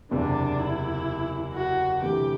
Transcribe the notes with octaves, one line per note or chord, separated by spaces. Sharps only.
F#1 E2 C3 D4
E4
F#4
D2 C3 E3 G4